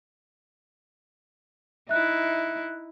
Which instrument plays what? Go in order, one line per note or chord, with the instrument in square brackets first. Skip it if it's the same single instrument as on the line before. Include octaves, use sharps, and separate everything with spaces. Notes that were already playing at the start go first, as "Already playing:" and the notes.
[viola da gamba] D#4 E4 [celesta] E5 F#6